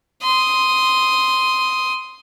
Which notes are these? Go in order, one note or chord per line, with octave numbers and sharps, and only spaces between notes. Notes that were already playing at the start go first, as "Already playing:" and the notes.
C6 D#6